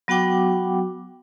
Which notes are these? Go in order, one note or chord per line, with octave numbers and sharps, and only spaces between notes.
F#3 B3 F#4 F#5 G5 D6